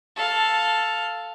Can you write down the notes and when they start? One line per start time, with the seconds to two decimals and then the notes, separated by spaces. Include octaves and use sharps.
0.16 A4 F5